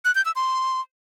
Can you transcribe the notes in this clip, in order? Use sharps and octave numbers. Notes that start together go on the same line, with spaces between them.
F#6
G6
E6
C6